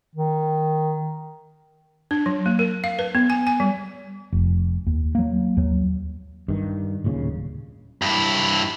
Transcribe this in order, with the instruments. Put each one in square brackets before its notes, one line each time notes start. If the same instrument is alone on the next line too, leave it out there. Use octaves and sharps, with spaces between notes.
[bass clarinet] D#3
[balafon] D4
F#3
A#3
A#4
F5
B4
B3
G#5
G#5
G3
[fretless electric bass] F1
D#2
F#3 A#3
D#2 F#3
G2 D#3
D1 D#2 A#2 C#3
[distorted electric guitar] G2 E4